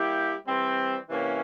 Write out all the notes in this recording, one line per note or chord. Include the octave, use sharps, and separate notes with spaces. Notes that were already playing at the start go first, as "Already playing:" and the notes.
Already playing: G3 A#3 E4 G4
E3 G3 C4
C3 E3 A#3 C#4